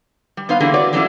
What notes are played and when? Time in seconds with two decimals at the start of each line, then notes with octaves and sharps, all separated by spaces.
0.37 G3
0.49 B3 D#4 C5 F5
0.60 D3 E3 A#3 G4 G#4 A#4
0.74 F#4 B4 C#5 D5
0.93 E3 F#3 G3 A3 C#4 E4